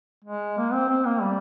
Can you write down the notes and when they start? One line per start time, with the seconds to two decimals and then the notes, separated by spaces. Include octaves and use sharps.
0.25 G#3
0.57 A#3
0.73 C4
0.89 C4
1.05 A#3
1.22 G3